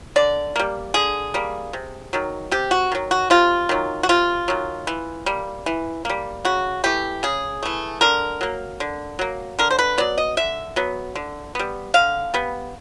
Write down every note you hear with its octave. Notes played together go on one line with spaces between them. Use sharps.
D3 D5
G3 A#3
D3 G#4
G3 A#3
C3
D#3 F#3
C3 G4
F#4
D#3 F#3
F#4
C3 F4
D#3 F#3
F#4
C3 F4
D#3 F#3
E3
G3 A#3
E3
G3 A#3
C#3 F#4
E3 A3 G4
C#3 G#4
E3 A3
D3 A#4
F#3 A#3
D3
F#3 A#3
D3 A#4
C5
B4
F#3 B3 D5
D#5
D3 E5
F#3 B3
D3
G3 B3
D3 F5
G3 B3